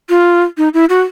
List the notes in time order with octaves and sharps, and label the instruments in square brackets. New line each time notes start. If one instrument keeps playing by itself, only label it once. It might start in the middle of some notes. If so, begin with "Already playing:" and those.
[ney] F4
D#4
E4
F#4